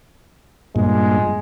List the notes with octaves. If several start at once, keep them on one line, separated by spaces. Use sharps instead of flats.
G2 A#2 G#3